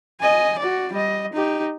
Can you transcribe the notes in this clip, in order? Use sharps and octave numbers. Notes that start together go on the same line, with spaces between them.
D#5 G#5
F#4 D5
G3 D#5
D#4 G4